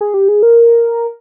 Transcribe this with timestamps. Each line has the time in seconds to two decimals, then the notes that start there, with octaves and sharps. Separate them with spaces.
0.01 G#4
0.14 G4
0.28 G#4
0.43 A#4